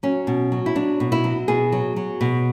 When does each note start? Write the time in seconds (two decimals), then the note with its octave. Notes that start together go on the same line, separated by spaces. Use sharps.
0.03 F#3 C#4
0.27 B2
0.52 F#3
0.66 E4
0.75 F#3 D4
1.00 B2
1.12 E4
1.24 F#3
1.48 B2 G#4
1.72 F#3
1.96 F#3
2.21 B2